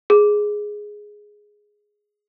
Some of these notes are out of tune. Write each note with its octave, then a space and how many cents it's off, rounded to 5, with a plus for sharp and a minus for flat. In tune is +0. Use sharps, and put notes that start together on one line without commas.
G#4 +0